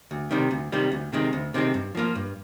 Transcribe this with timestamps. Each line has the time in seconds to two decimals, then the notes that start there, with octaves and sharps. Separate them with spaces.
0.11 D2
0.31 C3 D#3 G3
0.51 D2
0.72 C3 D#3 G3
0.92 D2
1.12 C3 D#3 G#3 C4
1.33 D2
1.54 C3 D#3 G#3 C4
1.74 G2
1.95 F3 A#3 F4
2.15 G2